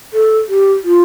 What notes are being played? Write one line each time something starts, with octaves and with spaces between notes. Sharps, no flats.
A4
G4
F4